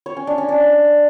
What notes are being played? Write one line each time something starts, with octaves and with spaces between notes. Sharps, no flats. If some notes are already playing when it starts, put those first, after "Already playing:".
C#5
C#4
D4
C#4
D4